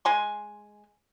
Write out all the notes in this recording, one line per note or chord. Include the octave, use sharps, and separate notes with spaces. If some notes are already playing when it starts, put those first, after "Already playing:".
G#3 G#5 C6